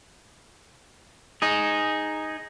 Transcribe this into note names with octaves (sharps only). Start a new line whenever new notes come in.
D#4 G#4